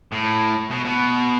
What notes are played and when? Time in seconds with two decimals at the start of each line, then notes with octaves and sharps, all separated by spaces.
0.12 A2
0.71 B2
0.85 B2